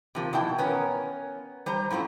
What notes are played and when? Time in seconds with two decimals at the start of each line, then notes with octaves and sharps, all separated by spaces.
0.15 C3 F3 A#3
0.33 B2 A#3 E4 G5 A5
0.58 B3 C#4 A#4
1.66 G3 C5 A#5
1.91 F#2 A2 F3 C4